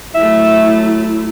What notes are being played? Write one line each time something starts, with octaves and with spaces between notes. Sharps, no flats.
F#3 A3 E4 E5